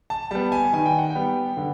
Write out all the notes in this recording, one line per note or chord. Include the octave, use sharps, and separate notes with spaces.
A5
G3 B3 A5
G#5
D#3 G#5
G5
F#5
G5
G3 B3
D3